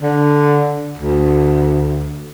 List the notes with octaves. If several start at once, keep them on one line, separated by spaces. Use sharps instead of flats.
D3
D2